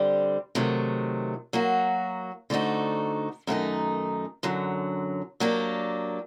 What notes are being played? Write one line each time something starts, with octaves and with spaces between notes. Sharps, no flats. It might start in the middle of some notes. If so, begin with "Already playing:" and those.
Already playing: D3 G3 C4 G4
C3 D#3 F#3 A3
F#3 A#3 F#4
D3 A3 C4 D#4 F#4
F#2 D#3 A3 C4 D#4
F#2 D3 F#3
F#3 A#3 D4 G4